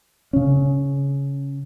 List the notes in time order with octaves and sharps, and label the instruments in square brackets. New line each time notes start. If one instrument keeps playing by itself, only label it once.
[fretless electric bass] C#3 C#4